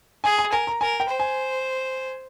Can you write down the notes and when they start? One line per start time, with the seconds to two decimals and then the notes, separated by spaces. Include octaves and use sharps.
0.24 G#4 G#5
0.38 G#5
0.52 A#4 G#5
0.67 A#5
0.81 A#4 G#5
1.00 G5
1.10 C5
1.20 G#5